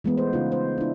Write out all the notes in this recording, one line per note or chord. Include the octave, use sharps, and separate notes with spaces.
E3 G#3 A3 B3
C5
C#3 D#4 F4
C5
D4 E4